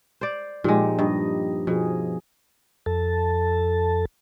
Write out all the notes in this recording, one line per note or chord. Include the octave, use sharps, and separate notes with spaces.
C5 D5
A#2 F3 G#3 D#4 G4
G2 D#5
B2 F3 G#4
F2 A4 A5